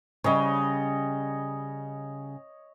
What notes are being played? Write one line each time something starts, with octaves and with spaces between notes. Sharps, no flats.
C#3 G3 C#5 D#5